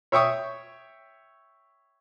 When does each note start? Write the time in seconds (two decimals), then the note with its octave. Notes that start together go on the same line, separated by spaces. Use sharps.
0.12 C#5 E5 G5 C#6 D#6